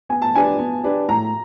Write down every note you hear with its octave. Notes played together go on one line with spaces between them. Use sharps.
B3 G#5
A5
D4 G4 B4 D5 G#5
B3
D4 G4 B4 D5
A2 A#5